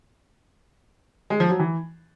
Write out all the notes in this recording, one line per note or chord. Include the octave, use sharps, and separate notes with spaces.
G#3
F3
F#3
E3